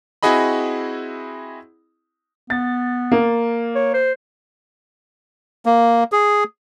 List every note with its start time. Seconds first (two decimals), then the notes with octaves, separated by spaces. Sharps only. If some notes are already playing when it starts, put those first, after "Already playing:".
0.23 C4 E4 F#4 G#4 D#5 B5
2.50 B3 A6
3.12 A#3
3.75 C#5
3.94 C5
5.66 A#3
6.12 G#4